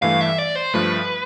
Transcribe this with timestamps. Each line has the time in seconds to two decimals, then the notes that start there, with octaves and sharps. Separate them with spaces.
0.02 G2 E3 A3 F5
0.21 E5
0.38 D5
0.55 C5
0.74 G2 F3 A3 B4